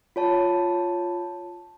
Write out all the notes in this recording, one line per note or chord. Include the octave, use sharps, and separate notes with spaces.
F4 C#5 A5